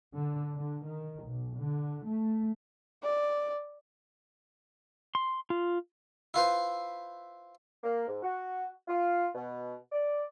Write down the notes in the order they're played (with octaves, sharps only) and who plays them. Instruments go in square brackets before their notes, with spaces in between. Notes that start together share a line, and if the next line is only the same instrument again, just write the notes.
[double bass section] D3
D3
D#3
B1
D3
A3
[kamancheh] D5
[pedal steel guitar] C6
F4
[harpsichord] E4 F4 B4 C5
[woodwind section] A#3
G#2
F#4
F4
B2
D5